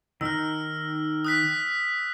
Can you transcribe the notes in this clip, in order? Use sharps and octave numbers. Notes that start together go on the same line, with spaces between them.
D#3 D#4 A#4 E6 F6
D#6 F#6 B6